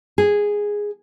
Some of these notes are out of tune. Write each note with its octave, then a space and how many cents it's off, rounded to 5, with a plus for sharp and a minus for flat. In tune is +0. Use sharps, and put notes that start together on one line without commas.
G#4 -5